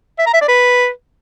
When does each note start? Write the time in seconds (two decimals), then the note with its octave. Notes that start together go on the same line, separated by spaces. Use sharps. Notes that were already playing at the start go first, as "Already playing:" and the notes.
0.19 E5
0.26 A#5
0.34 E5
0.41 D5
0.49 B4